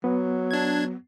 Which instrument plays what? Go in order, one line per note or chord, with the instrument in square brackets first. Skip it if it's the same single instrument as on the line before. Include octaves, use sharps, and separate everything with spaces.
[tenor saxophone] F#3 [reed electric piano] B3
[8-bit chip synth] D4 G#6